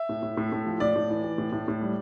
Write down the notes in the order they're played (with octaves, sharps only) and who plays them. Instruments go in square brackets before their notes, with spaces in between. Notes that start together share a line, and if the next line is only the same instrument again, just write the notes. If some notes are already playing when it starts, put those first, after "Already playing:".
Already playing: [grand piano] E5
A2
A2
A2
A2
F3
A2 D5
A2
E3
E3
A2
A2
A2
G3